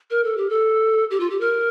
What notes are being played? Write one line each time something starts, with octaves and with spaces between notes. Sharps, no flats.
A#4
A4
G4
A4
G4
F4
G4
A#4